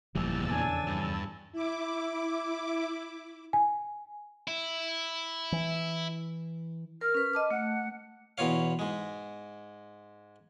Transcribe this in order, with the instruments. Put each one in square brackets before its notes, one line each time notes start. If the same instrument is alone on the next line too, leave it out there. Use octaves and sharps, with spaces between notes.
[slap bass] F#1 F3 G3 [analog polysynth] E2 E6 A6 [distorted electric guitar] A#2 E3
[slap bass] F2 C#3 [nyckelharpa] D4 G#5
[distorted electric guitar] G2
[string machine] E4 D6
[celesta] G#5
[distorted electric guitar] E4
[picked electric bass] E3
[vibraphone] A#4 [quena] F6
[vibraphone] C#4 B4
D#5 A5 D6
[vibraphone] A3 [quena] F#5
[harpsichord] E2 B2 F4 C#5 F5
G#2 G#3